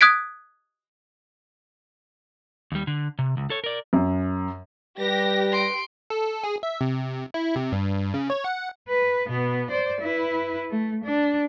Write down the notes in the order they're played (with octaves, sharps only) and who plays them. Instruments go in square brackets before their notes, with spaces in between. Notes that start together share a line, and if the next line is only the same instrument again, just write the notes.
[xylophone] D#6 F#6 G#6 B6 D7
[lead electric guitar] D#2 G3
D3
C3
C#2
A4 C#5
A#4 D5
[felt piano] F#2
[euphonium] G3 [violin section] G4 A#6 [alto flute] B4
[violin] C6 D7
[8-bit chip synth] A4
G#4
E5
C3
E4
C3
G2
C#3
C#5
F#5
[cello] B4
B2 B3
C5 D5
E4 B4
A3
D4